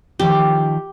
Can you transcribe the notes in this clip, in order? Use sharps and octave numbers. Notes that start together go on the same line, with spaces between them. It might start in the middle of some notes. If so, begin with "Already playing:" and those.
D#3 F3 G4